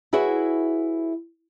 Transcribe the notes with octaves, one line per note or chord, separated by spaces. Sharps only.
E4 F#4 G#4 B4 C#5 E5